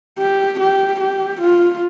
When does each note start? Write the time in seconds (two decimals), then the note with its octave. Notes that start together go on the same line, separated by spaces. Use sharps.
0.18 G4
0.60 G4
1.01 G4
1.42 F4